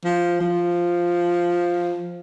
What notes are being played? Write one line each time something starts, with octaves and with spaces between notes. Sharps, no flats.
F3
F3